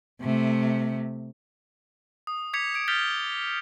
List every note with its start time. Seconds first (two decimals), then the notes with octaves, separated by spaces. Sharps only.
0.22 C3 A3
2.27 D#6
2.53 D6 G#6 B6 C#7 F7
2.75 G#6 D7
2.88 F6 G6 A6 B6 F7 G7